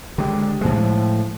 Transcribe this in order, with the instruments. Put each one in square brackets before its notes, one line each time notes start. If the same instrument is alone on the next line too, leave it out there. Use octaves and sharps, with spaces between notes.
[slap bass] D3 G#3 [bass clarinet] G4
[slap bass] A2 G#3 [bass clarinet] F3